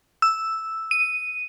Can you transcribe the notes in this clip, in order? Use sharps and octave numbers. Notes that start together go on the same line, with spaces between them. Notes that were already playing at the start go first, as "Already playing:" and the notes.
E6
D#7